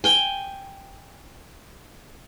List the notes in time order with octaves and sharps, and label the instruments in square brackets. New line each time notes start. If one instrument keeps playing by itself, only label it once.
[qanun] G5 G#5